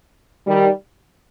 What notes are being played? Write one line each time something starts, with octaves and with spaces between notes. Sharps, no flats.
D#3 G3